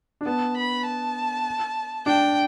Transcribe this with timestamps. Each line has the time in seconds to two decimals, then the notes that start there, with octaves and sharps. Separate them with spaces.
0.21 D4
0.26 B3 A5
0.57 B5
0.86 A5
2.06 D4 G5